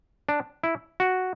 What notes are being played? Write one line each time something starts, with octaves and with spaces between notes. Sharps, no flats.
D4
E4
F#4